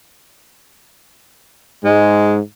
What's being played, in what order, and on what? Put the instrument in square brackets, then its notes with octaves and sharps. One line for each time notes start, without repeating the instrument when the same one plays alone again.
[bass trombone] G#2 [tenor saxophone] G#3